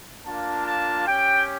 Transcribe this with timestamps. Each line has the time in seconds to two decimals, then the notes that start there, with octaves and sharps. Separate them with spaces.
0.25 A#3 D4 F4 A5
0.65 A5
1.07 C#4 G4 G5